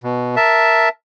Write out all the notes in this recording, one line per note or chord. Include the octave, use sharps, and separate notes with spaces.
B2
A#4 E5 A5